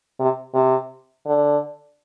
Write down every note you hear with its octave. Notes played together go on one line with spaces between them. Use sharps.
C3
C3
D3